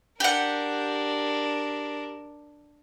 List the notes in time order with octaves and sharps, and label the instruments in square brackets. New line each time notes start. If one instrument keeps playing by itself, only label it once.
[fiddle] D4 A#4 [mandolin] G4 F#5